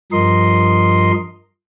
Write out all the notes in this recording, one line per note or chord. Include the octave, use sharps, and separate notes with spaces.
G2 F3 A#4 D#5 C6